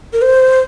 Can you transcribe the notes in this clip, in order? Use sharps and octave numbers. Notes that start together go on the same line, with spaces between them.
A#4
C5